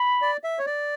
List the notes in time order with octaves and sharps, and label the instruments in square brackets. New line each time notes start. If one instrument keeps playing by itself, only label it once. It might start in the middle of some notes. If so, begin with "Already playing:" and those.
Already playing: [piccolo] B5
[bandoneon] D5
E5
C#5
D5